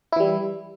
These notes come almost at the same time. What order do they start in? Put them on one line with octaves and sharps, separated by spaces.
E4 E3 G3